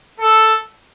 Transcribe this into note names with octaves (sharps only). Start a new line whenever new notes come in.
A4